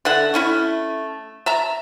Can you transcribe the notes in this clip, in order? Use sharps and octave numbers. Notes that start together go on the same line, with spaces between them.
D3 E5 F#5
A3 C#4 E4
E5 A5 A#5